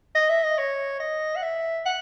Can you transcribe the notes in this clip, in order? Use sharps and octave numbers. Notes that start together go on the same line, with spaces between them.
D#5
E5
D#5
C#5
D#5
F#5
E5
F#5